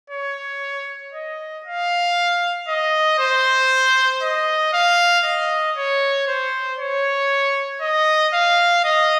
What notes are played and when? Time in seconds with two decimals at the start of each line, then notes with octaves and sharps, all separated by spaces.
0.10 C#5
1.14 D#5
1.65 F5
2.68 D#5
3.19 C5
4.22 D#5
4.73 F5
5.24 D#5
5.76 C#5
6.27 C5
6.79 C#5
7.81 D#5
8.33 F5
8.84 D#5